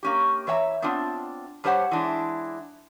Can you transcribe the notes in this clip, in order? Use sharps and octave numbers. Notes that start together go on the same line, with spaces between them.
A#3 C#4 G4
E3 C#5 E5 F#5 A#5
B3 C4 D4 F4
G2 G3 G4 C5 C#5 F#5
E3 G#3 D4 E4